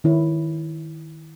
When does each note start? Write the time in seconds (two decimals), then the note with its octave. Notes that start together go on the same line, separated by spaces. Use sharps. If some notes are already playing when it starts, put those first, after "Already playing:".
0.04 D#3 E4 C#5